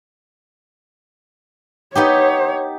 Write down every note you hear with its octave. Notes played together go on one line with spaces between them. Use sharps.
B3 D#4 G4 C#5